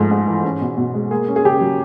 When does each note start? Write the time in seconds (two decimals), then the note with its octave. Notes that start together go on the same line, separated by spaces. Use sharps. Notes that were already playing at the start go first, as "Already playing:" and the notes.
Already playing: G#2 F3 A3
0.11 G#2
0.28 E3
0.44 C#4
0.61 B2
0.77 B2
0.94 G#3
1.11 A#3 G#4
1.28 C#4
1.36 G#4
1.44 C#3 G4
1.61 F#3